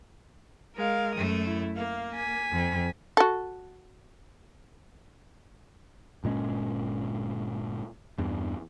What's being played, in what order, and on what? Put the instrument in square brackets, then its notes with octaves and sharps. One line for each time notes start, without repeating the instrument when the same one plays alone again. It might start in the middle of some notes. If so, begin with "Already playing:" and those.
[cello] G#3 [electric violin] A#4 F5
[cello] F#2 A3 [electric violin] D#6
[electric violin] E4
[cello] A#3 [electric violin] F5
[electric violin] G#5 B6
[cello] F2
[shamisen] F#4 A4
[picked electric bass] G1 A#2 G#3 C#4
E2 G2